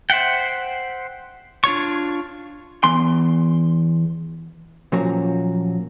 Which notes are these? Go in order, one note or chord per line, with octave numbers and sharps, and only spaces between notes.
C5 E5 F#5 G5
D4 F4 C#5 C#6
E2 C6
A#2 F3 F#3 A#3 C#4 F#4